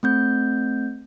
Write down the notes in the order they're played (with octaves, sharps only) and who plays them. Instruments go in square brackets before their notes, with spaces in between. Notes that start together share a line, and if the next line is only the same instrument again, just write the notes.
[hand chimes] A3 C4 G6